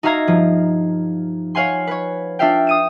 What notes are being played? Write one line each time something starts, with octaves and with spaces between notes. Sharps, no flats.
D#4 F#4 E5 F5 A#5 G#6
G2 F3
C#5 F5 F#5 G#5 C6
B4 C#5
D4 F4 E5 F5 G5
D#6 D#7 E7